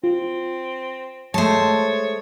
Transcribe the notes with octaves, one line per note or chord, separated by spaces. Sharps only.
C4 F4
G#3 A3 C5 C#5 A5